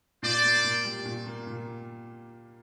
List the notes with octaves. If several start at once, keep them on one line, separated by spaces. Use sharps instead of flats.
A#2 C5 D5
A#3
A#2
G3
A#2
A#3
A#2